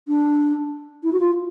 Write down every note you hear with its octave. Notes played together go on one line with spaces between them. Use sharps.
D4
E4
F#4
F4